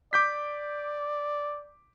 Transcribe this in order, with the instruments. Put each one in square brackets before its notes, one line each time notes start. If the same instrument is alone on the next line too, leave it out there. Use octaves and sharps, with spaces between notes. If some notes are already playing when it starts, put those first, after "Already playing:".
[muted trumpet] D5 [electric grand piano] D6 G6 B6